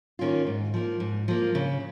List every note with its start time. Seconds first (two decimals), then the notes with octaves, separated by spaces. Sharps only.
0.19 D#3 A#3 C#4 F4
0.47 G#2
0.74 F3 A#3
1.00 G#2
1.28 F3 A#3
1.55 C#3